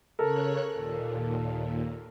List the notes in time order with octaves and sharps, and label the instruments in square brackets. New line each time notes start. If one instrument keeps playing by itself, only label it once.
[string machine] C#3 C#5 F#6 [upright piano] A4 A#4
[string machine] D#2 A#2